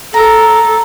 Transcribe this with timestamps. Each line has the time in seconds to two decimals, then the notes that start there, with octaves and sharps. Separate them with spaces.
0.14 A4 A#5